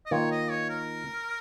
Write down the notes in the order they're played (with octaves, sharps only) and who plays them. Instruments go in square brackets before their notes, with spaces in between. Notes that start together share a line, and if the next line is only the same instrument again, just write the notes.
[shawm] D#5
[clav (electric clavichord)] D#3 A#3 F4 [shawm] C#5
[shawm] D#5
C#5
A#4